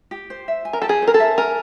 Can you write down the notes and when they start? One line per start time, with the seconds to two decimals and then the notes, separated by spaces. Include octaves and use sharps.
0.11 G4
0.30 C5
0.48 E5
0.65 G#5
0.73 A#4
0.82 G4 A4
0.89 G#4
1.02 C5
1.08 A#4
1.14 A4
1.20 E5
1.38 A#4 G#5